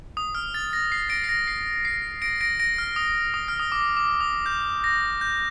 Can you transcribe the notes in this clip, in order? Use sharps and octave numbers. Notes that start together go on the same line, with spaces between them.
D#6
F6
A6
A#6
C7
A#6 D7
C7
A#6
C7
C7
A#6 D7
A#6 D7
A#6 D7
F6
D#6
D#6
F6
D#6
D6
D6
D#6
G6
A#6
G6